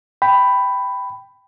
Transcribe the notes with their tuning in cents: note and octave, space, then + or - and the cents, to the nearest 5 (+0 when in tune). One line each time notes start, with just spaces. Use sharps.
G5 +0 B5 +10